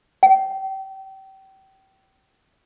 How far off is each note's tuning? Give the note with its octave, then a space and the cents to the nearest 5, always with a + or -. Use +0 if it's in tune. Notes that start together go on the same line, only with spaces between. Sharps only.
G5 -30